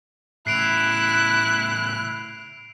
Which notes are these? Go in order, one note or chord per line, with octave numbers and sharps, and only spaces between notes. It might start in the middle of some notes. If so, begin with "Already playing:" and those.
A2 C#3 E4 F#6 C7 D7 F7